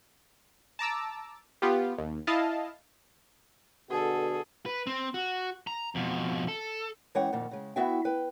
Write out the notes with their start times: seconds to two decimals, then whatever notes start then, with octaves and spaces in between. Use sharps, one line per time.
0.79 A5 A#5 D6 E6
1.62 B3 F4 G4
1.98 D#2
2.27 E4 D#5 F5 A5
3.90 B2 D3 F#4 G#4 A4
4.66 B4
4.87 C4
5.14 F#4
5.67 A#5
5.95 F2 B2
6.48 A4
7.15 E3 G#3 C#4 C#5 F#5 G5
7.33 F2 A#2 D#3
7.51 C#3 G#3
7.76 B3 E4 F#4 E5 G5
8.05 B4 G5